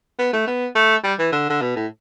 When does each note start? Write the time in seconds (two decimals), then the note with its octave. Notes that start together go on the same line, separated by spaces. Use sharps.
0.19 B3
0.33 A3
0.47 B3
0.75 A3
1.04 G3
1.19 E3
1.32 D3
1.50 D3
1.61 B2
1.76 A2